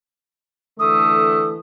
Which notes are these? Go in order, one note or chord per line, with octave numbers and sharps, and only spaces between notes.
D3 E3 A3 A4 D#6